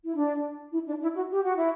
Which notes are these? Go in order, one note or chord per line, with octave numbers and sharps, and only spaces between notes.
E4
D4
E4
D4
E4
F#4
G4
F#4
E4